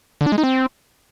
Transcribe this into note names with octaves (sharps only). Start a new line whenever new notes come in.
D3
D4
G#3
D#4
C4